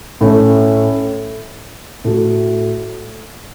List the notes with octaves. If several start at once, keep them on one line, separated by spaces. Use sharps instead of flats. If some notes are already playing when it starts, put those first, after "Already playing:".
A2 A3 C#4
A2 A3 F#4